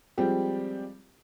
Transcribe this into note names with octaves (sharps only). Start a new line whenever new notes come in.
F3 G3 G#3 C4 G4